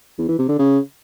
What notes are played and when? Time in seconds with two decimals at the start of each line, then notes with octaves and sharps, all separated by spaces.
0.18 E2
0.29 E3
0.39 C3
0.49 D3
0.59 C#3